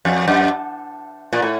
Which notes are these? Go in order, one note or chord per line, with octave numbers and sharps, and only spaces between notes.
F2
F#2
A#2
A2